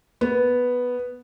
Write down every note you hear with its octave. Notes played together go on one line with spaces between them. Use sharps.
B3